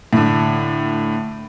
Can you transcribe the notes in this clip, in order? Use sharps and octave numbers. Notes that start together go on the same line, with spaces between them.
A2 D3